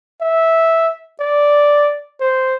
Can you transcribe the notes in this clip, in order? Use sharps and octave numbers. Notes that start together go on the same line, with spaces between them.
E5
D5
C5